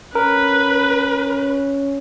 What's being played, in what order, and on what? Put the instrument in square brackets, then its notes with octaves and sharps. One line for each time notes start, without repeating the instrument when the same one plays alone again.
[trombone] C#4 [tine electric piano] A#4 [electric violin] B4